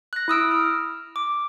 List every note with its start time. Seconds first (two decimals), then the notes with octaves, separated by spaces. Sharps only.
0.13 F#6 A#6
0.28 E4 D#6 E6 D7
0.51 F6
1.16 D6